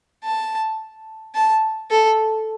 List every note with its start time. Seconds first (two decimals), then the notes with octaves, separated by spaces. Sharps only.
0.24 A5
1.35 A5
1.91 A4